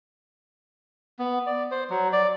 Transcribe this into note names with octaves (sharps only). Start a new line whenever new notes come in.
B3
D5
C5
F#3
D5